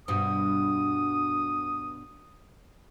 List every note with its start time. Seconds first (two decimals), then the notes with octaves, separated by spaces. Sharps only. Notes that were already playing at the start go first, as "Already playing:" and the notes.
0.08 G2 B2 D#6